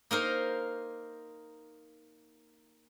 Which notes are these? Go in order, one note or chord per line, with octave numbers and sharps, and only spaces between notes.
A#3 D#4 A#4 C5